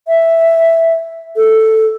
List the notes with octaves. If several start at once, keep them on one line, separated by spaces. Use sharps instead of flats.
E5
A4